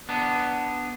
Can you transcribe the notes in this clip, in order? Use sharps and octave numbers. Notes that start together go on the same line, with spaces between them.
B3 D4